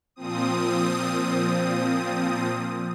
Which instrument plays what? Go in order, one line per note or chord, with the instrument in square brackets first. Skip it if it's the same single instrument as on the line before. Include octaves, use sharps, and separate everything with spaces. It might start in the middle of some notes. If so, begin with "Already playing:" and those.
[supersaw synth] A#2 F3 C4 D#6